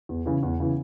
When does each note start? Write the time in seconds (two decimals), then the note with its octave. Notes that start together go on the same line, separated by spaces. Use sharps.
0.09 E2
0.26 C#3 E3
0.43 E2
0.60 C#3 E3